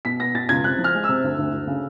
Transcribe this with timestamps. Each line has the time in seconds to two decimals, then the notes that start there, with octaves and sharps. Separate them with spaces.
0.05 B2 B6
0.20 B3 A#6
0.34 B2 A6
0.49 C#2 G#6
0.64 C3 F#6
0.79 F3
0.84 F6
0.94 G#3
1.04 E6
1.09 C3
1.24 D2
1.39 D2
1.53 D2
1.67 C#3